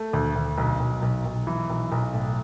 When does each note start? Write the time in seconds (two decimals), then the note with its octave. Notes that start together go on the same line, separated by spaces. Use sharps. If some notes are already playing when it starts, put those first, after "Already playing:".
Already playing: A3
0.13 D2
0.35 D2
0.58 B1
0.80 B1
1.02 B1
1.26 B1
1.47 E3
1.70 B1
1.92 B1
2.14 A2